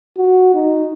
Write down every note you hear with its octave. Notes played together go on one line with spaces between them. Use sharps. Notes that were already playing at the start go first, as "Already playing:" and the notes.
F#4
D#4